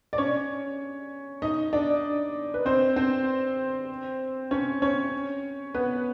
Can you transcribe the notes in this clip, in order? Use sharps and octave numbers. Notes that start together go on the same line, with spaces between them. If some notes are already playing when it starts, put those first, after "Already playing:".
D5
C#4 C#5
D#4 D#5
D4 D5
B4
C4 C5
C4 C5
C#4 C#5
C#4 C#5
B3 B4